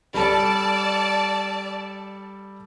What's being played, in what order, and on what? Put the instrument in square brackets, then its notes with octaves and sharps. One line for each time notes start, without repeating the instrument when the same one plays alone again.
[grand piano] G3 A4 [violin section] D5 A5